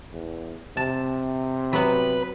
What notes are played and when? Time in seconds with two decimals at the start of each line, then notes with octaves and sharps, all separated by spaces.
0.13 E2
0.77 C3 A5
1.73 F#3 B3 B4 B5